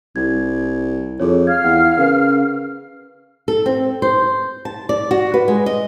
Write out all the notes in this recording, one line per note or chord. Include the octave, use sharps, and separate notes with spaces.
C2 G#6
F2 G#4 A4 C#5
F5 F6 G#6
E2 F#5
C#3 A#4 B4
A4
C4
C5
A5
D5
F#4
B4
G#3
D#5